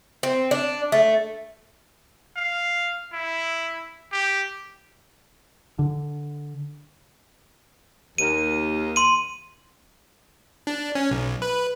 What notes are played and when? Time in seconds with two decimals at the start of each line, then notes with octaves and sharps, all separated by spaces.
0.23 C4
0.51 D4
0.92 A3
2.36 F5
3.13 E4
4.12 G4
5.79 D3
8.18 D#2 D#7
8.96 C6 D#7
10.67 D4
10.95 C#4
11.11 B1
11.42 B4